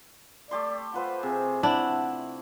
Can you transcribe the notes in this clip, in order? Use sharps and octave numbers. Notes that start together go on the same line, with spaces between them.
A3 G4 D5 C6
F4 B4 C5 F#5
C3 G#4
D4 E4 F#5